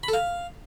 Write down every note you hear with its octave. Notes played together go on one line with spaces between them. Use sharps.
B5
A4
F5